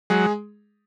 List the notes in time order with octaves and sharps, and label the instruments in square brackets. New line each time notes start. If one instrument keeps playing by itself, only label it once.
[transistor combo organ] F#3 [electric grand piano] G#3 G#4